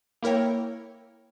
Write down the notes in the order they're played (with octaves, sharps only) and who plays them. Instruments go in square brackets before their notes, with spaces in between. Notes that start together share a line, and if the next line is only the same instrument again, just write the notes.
[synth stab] A#3 E4 A#4 C#5 G5